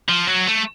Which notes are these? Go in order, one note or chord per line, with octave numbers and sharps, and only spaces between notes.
F3
F#3
A3